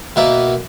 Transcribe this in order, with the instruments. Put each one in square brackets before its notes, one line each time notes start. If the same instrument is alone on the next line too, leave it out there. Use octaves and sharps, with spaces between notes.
[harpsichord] B2 A#3 E4